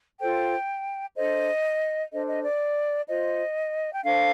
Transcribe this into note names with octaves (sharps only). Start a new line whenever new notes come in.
F4 A4 C5 G5
D4 A4 C5 D#5
D4 A4 C5 D#5
D#5
D5
F4 C5 D#5
G5
D4 A4 C5 F5